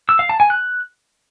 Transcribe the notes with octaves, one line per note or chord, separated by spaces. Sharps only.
E6
F5
A5
G#5
F#6